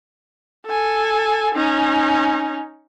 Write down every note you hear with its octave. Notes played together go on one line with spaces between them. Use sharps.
A4 G#5
C#4 D#4